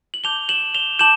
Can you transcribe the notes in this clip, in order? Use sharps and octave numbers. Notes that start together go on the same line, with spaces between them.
F#7
A5 D6 G6 F7 G7
E7 F#7
F7 G7
A5 D6 G6 E7 F#7